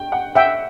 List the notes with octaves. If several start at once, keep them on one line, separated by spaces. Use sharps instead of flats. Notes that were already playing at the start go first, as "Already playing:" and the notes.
Already playing: G5
F#5
E5 F#5 G5